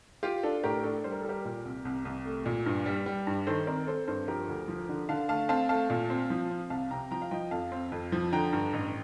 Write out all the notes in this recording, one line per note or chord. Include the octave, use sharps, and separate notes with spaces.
F4 G4
D4 A4
A2 G4 A#4
D4 A4
G3 C5
A#4
A4
G3 G4 A#4
A#2
C2
C2
C2
A3
A#2
G2
G3
G3
G2
D#3 A4 C5
C4 A#4 D5
C4 A4 C5
G2 A4 C5
F3 G4 A#4
D2
F3
D3
D3 F5 A5
A3 F5 A5
C4 F5 A5
A3 F5 A5
A#2
C4
F3
C4
C2 F5 A5
C3 G5 A#5
F3 G5 A#5
F5
F3 D#5 G5
F2 F5 A5
C4
F2
F3
D3 G5 A#5
G2
A1